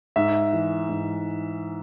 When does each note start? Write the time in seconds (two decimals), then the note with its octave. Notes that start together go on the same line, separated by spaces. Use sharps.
0.16 G#2 E5
0.53 E3
0.89 G#2